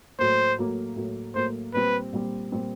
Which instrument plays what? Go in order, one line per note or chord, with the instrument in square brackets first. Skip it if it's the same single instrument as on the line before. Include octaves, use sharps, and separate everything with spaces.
[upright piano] A2 F#3 A#3 [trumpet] C5
[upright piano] A2 F#3 A#3
A2 F#3 A#3
[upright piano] A2 F#3 A#3 [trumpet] C5
[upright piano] A#2 G3 C4 [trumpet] B4
[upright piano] A#2 G3 C4
A#2 G3 C4